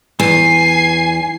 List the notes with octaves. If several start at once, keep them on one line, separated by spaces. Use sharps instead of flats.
E2 G#5 C7